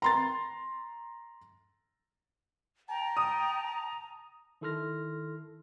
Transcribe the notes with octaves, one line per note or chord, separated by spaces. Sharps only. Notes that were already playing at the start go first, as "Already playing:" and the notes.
A#5 C6 A6
G5 A5 A#5
D#6
D#3 E4 A4 C6 F6 A#6